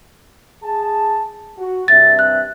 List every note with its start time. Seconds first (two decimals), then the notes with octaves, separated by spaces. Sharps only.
0.63 G#4 A5
1.57 F#4
1.88 G2 C3 E5 A6
2.19 F#6